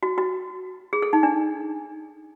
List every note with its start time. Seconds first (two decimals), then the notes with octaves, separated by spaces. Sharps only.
0.03 F#4
0.18 F#4
0.93 G#4
1.02 A4
1.13 D#4
1.23 D4